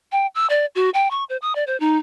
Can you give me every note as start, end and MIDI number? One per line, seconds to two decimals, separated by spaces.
0.12 0.27 79
0.35 0.47 88
0.50 0.66 74
0.75 0.90 66
0.94 1.10 79
1.11 1.24 85
1.29 1.37 72
1.42 1.55 87
1.55 1.64 74
1.67 1.79 72
1.80 1.98 63